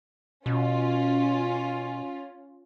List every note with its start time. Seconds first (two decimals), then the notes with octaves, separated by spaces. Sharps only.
0.46 B2 C#4 F4